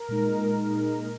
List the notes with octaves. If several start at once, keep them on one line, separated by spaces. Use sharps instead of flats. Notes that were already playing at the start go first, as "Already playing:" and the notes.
Already playing: A#4
A#2 G#3 D#4
A#2 G#3 D#4
A#4